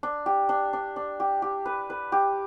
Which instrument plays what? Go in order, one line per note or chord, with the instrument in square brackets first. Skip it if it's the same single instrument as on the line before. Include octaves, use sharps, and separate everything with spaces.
[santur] D4
G4
D4
D4
D4
G4
G4
B4
B4
G4